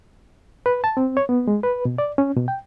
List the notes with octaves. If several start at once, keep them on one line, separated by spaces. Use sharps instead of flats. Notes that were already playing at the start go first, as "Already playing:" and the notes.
B4
A5
C4
C#5
B3
G#3
B4
B2
D5
C#4
B2
G5